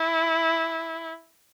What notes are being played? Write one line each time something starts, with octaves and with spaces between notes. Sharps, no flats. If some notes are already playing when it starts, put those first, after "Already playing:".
Already playing: E4